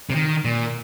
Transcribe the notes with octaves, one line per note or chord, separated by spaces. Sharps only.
C3
D#3
A#2